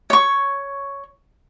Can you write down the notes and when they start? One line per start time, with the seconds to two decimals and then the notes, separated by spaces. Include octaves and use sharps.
0.10 C#5 C#6